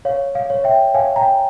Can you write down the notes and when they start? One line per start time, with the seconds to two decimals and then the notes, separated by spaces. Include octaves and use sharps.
0.05 C#5 F5
0.35 F5
0.50 C#5
0.64 E5 G5
0.94 C#5 F5 G#5
1.16 G5 A#5